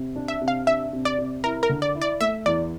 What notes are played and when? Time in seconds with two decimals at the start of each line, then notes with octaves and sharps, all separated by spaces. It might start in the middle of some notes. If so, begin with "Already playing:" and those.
Already playing: C3
0.16 D4
0.28 E5
0.41 C3
0.48 F5
0.67 D4 E5
0.93 C3
1.05 D5
1.18 C3
1.44 E4 A#4
1.63 A#4
1.69 D3
1.82 D5
1.95 E4
2.01 D5
2.20 A3 E5
2.46 E2 D5